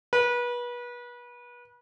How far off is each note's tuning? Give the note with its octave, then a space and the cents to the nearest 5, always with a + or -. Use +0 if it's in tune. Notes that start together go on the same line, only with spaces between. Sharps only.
B4 -30